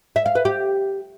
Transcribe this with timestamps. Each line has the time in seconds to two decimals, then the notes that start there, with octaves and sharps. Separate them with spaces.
0.16 E5
0.26 F5
0.35 B4
0.45 G4